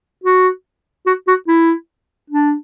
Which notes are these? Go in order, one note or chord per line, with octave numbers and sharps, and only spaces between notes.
F#4
F#4
F#4
E4
D4